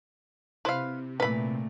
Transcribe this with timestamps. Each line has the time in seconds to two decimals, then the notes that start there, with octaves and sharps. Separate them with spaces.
0.65 C3 E4 B4 C5 F5
1.20 A#2 D#3 E3 A3 B4 B5